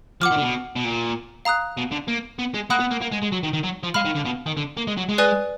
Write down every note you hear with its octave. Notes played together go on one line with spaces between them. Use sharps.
F3 F#5 D6 F6
D#3
D3
B2
B2
A#2
F5 A#5 D#6 F#6
B2
D3
A#3
B3
G#3
A#3 F#5 B5 D#6 F#6
B3
A#3
A#3
G#3
G#3
F#3
D#3
D#3
F#3
F3
G#3 F5 B5 F6
D#3
D3
B2
D#3
D3
A#3
G#3
F#3
G#3
B4 D5 G#5 D#6 F#6